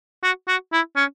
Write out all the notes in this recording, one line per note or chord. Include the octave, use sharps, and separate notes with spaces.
F#4
F#4
E4
C#4